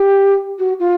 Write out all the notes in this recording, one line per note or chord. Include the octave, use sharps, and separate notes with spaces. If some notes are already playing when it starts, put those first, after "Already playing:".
Already playing: G4
F#4
F4